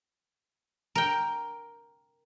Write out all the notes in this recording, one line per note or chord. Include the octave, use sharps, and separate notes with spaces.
A#4 G5